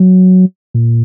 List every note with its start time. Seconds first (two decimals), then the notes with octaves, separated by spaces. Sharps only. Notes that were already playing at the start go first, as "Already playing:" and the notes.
Already playing: F#3
0.74 A#2